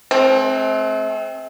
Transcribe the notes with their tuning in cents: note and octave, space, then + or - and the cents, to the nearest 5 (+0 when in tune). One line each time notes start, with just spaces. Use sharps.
A3 -40 C4 +20